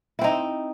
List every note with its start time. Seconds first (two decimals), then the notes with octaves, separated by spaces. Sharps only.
0.19 E4
0.21 C4
0.24 D#4